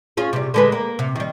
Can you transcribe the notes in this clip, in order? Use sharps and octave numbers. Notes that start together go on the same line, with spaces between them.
C#4 F4 G#4
C3 G3
D3 G#3 B4
A#3
C3
D#3 G3